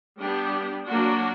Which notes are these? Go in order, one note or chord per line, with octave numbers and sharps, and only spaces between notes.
G3 B3 D4 G4
F#3 A#3 D4 F#4